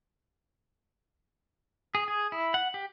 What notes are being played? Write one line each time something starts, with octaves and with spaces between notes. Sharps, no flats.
G#4
G#4
E4
F#5
G4